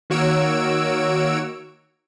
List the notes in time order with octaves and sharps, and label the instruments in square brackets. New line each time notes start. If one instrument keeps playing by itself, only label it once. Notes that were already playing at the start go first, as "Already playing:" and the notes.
[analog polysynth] D#3 A#3 F#4 C#5 E6 D7